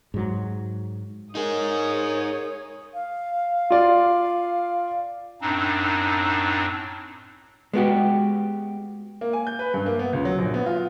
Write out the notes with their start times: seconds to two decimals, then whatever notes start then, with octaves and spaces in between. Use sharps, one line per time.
0.14 G#2 F#3
1.35 D#4 G#4 A#4 C#5 D#6
2.94 F5
3.71 F4 D5
5.41 F#2 A2 C4 D4 D#4
7.73 G#3 B3 F#4 G4
9.21 A#3
9.33 G#5
9.47 G6
9.59 B4
9.74 G2
9.86 A#3
9.99 B3
10.13 C#2
10.25 F#3
10.38 A#1
10.54 B3
10.66 F4